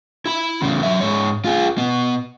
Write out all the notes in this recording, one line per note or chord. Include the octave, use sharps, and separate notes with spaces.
E4 B5
E2 C#3
F#3 E5
G#2 C#5
F4 G#4
B2 B3